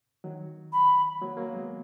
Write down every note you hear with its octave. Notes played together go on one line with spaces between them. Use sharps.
D#3 F#3
B5
F#3 A#3
F#3 A#3
G#3 B3